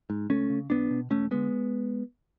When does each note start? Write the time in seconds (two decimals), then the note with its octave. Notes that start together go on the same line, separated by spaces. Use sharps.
0.10 G#2
0.30 C#2 A3 C#4
0.50 C#3
0.70 B1 B3 D4
0.90 B2
1.10 E1 A3 C#4
1.31 D3 G#3 B3